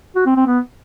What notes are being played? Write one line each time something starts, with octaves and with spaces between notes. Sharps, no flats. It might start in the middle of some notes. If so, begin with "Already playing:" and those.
F#4
C4
C4
B3